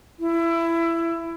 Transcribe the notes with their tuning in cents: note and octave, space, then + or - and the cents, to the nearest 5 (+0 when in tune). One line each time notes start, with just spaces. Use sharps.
E4 +20